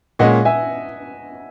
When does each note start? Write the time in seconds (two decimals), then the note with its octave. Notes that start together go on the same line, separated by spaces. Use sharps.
0.19 A#2 G#3 C#4 D#5 F#5
0.45 E5 G#5